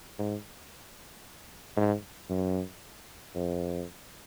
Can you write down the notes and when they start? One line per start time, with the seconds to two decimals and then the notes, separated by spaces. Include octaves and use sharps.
0.19 G#2
1.77 G#2
2.30 F#2
3.35 F2